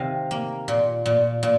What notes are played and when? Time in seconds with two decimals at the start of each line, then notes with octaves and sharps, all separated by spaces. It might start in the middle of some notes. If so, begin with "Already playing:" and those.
Already playing: C3 D#3 D#5 F5
0.31 A#3
0.68 A#2
1.06 A#2
1.43 A#2